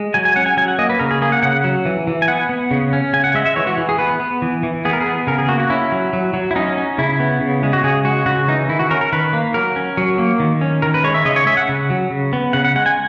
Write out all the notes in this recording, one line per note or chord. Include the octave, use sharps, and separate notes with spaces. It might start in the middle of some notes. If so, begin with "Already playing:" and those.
Already playing: G#3
F#3 G#5
G#5
C#4 F#5
G#5
F#3 G#5
F#5
A#3 D#5
B4
C#3 A#4
G#4
A#3 G#4
F#5
C#3 F#5
F#3
E3
E3
G#5
B3 F#5
B3
C#3
C#4
C#3 G#5
F#5
G#3 E5
E5
E3 C#5
F#4
E3
G#4
B3 B4
B3
E3
E3
B3 G#4
A#4
G#4
B3
C#3 A#4
G#4
A#3 F#4
F#4
C#4 E4
F#3
F#3
F#3
E4
C#4 D#4
C#4
C#3 E4
B3
C#3
G#3
F#4
C#3 G#4
G#3 F#4
C#3 F#4
E3 D#4
D#3 E4
F#4
C#4 A#4
A#4
D#3 B4
A#3
F#3 A#4
C#4
F#3
A#3
D#3
C#4
D#3 A#4
B4
G#3 C#5
E5
C#3 D#5
C#5
C#4 E5
F#5
C#3
F#3
C#3
B3
C#3 F#5
F#5
G#3 F#5
G#5